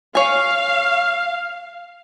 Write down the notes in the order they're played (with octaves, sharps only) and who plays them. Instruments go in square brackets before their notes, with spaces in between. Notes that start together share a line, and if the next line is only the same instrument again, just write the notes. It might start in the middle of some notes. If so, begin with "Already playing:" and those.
[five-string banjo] C#5 G#5 [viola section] F5